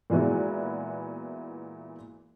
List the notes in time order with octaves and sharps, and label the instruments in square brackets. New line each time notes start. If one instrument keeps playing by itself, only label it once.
[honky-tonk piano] A#2 E3 G#3 B3 E4 F#4